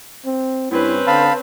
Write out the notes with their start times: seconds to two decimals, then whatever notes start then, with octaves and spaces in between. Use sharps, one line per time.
0.25 C4
0.71 G2 C4 C#4 E4 B4
1.07 D3 F5 A5 B5